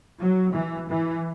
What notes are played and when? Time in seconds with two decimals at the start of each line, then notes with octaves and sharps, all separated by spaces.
0.20 F#3
0.54 E3
0.89 E3